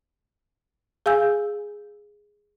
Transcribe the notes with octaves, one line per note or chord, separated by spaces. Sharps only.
G#4 F5 G#5 E6 G6